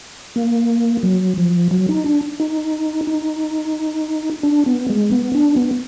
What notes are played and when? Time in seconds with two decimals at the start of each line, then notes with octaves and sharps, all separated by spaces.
0.36 A#3
1.03 F#3
1.37 F3
1.71 F#3
1.89 D#4
2.06 D4
2.40 D#4
3.07 D#4
4.43 D4
4.66 B3
4.90 G#3
5.11 B3
5.35 D4
5.56 B3